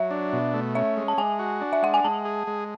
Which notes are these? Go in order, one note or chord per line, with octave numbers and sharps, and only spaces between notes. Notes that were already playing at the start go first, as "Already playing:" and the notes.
Already playing: F#3 E5
D4
B2
A3
C#4 E5
G#3
A5
G#3 G#5
F#4
D4
E5
G#3 F#5
G#5
G#3 A5
G#4
G#3